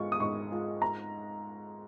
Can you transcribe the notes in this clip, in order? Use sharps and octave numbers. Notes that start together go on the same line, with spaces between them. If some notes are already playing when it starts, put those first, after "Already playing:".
Already playing: G#2 G#3 F4 C#6
D#6
G#2 C#6
G#3 F4
A#5